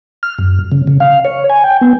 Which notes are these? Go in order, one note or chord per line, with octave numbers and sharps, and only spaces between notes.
F6
F#2
C#3
C#3
F5
C#5
G#5
G5
B3